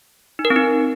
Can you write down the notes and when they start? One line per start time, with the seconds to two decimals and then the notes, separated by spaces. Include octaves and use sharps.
0.39 D#4
0.45 A#4
0.50 C4
0.56 D#4